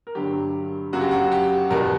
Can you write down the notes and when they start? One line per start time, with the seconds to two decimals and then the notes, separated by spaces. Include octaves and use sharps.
0.07 A#4
0.15 G2 D3 F#3 G4
0.93 F#2 C#3 F#3 F#4
1.01 G4
1.11 F#4
1.32 G4
1.70 E2 B2 G3 A#4